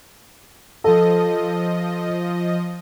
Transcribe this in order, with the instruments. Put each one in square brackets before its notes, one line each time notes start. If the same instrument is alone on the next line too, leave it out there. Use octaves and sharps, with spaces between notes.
[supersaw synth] F3 D#5 [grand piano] A4